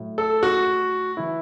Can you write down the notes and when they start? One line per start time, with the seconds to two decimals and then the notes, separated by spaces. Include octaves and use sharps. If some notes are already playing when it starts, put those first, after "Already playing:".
Already playing: A2 F#3
0.18 A4
0.43 F#4
1.17 E3 E4